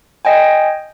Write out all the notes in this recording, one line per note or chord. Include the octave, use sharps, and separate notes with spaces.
D#5 G5 G#5